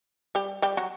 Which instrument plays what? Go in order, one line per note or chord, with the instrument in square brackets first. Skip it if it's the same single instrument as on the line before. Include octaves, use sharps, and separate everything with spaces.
[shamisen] G3 G4
G3 G4
F#3 F#4